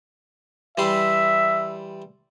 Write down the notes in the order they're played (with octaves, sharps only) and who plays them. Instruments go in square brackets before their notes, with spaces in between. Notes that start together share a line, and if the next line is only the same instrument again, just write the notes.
[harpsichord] E3 G3 C6 [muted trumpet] E5